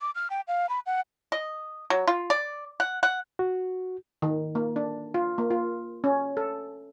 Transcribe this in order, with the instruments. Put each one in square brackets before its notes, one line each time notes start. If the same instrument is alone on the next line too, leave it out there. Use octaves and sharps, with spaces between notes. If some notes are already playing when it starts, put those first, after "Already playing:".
[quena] D6
F6
G5
F5
B5
F#5
[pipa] D#5
F#3
F4
D5
F#5
F#5
[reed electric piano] F#4
[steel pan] D#3
A#3
D4
F4
A#3
F4
C#4
A4